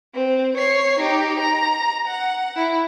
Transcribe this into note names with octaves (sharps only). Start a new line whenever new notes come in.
C4
C#5 C7
D#4 G4
A#5
F#5
E4